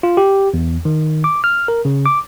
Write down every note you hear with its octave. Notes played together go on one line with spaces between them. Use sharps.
F4
G4
E2
D#3
D6
F6
A#4
C#3
D6